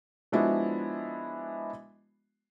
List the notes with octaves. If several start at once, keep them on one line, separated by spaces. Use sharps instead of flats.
F3 G#3 B3 D4 E4 F#4